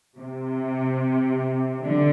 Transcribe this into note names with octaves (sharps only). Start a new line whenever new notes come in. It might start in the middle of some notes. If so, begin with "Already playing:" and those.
C3
D3